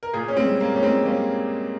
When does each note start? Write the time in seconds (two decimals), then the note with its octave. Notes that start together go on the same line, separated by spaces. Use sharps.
0.03 A#4
0.13 A#2 F4 G#4
0.28 C#4
0.37 G#3 C4
0.45 G3
0.60 A#3
0.75 A#2 C#4
0.83 G#3 C4
1.05 G3 A#3 C#4